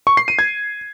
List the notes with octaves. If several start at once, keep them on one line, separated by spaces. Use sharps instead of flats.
C#6
C7
D#7
G#6